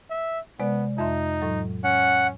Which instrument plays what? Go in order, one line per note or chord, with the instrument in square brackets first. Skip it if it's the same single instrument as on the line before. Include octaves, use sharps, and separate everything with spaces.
[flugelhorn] E5
[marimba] C3 G#3 D5 [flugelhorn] B3
[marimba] F2 E5 C6 [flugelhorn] D#4
[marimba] A2 F#3
[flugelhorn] C#4 [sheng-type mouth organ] F#5